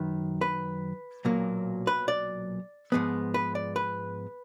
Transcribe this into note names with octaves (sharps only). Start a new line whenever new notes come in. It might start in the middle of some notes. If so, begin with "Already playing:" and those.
Already playing: F#2 D#3 B4
B4
B1 A#2 F#3 A#3
B4
D5
G#2 F3 G#3 B3
B4
D5
B4